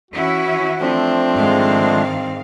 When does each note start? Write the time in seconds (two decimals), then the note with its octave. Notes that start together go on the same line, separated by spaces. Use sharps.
0.11 E3 C#4 E4 F#4
0.81 F3 A3 C4 D4
1.32 G#2 D#3 G#3 F5